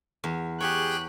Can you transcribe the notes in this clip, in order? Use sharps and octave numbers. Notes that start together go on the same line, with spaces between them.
E2
G4 G#4 C#5 G5 F#6